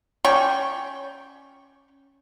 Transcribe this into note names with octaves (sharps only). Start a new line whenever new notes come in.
C#4 D5 G5 C#6